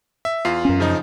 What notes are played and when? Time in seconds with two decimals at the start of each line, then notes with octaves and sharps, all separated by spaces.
0.25 E5
0.45 E2 F4 C7
0.65 F#2 C#4
0.80 C#3 F3 D#4